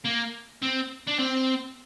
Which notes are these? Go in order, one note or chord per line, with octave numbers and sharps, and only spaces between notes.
A#3
C4
D4
C4